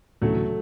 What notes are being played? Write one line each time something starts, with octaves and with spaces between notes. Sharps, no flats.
D2 C#3 E3 F#3 A3